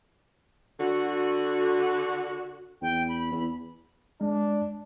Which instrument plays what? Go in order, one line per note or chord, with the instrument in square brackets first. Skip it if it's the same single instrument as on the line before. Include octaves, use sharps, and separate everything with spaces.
[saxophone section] D3 F#4
[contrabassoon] E2 [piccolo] G5
[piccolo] B5
[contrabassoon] E2
[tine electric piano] G#3 [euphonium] D4